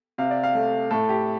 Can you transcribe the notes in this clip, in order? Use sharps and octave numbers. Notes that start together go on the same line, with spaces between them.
C3 F5
D5
F5
A3
A2 A4
G4